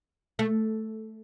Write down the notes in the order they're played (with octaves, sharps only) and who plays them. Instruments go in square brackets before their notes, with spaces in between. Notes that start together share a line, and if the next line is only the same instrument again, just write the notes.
[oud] A3